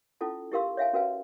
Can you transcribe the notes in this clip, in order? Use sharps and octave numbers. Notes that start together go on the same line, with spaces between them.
C#4 E4 F4 A4 A5
E4 G4 A#4 F5 C6 E6
C#5 E5 F5 G#5
C#4 F#4 A#4 B4 F5 G#5